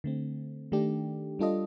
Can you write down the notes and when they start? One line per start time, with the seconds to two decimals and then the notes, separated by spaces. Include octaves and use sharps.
0.04 D3 A3 C4
0.72 D#3 A3 D4 G4
1.39 G3 D4 F4 A4 D#5